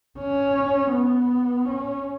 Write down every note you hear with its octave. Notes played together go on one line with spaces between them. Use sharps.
C#4
B3
C#4